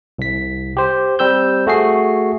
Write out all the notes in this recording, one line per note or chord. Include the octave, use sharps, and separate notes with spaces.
C2 B6
G4 C5
G3 C4 E6 G6
A3 F#4 G#4 C7